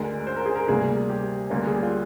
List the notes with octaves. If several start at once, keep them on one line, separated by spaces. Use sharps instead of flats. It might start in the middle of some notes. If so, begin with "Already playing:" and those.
Already playing: D2 D3 G#3 A#4
C5
A#4
G#4
A#4
D2 C3 G3 A#3 G#4
G4
D2 D3 G3 A#3 D4
G#4
G4
F4